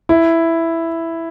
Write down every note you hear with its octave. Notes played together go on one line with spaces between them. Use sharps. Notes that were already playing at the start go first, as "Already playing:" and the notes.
E4